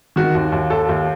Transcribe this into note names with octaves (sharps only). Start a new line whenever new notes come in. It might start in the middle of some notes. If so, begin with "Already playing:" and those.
D#3 F#4
D#2
D#2
D#2 A4
D#2